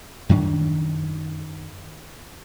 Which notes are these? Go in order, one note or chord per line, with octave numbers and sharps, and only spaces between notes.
F#2 D#3 C4 D4